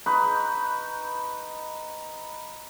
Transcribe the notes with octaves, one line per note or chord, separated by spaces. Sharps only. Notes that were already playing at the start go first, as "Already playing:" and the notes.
D#4 B4 C#6